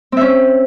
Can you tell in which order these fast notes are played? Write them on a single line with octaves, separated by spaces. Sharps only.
C4 E5 C#4